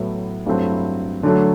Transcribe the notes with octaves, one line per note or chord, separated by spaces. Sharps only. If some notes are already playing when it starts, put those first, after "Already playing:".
Already playing: A2 F#3 B3 E4 A4
G2 F#3 A3 C4 E4
D3 F#3 A3